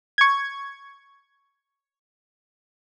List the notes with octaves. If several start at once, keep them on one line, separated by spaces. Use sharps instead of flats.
C#6 G#6